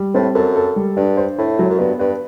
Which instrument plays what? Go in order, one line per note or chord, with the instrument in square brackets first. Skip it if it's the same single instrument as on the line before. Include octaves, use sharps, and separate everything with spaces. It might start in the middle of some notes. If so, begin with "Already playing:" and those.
Already playing: [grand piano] G3
[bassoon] A2 [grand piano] C4
[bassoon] F#2 [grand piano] A4
[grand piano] A4
G3
[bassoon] G2 [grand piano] D4
[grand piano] C5
[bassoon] A2 [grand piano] E4
[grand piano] F#3
[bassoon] F#2
[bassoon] G2 [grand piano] B3
[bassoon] G2 [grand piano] B4